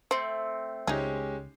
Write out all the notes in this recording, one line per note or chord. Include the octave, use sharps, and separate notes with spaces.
A3 C4 C5
C#2 G#3 C#4 D#4 G4 G#4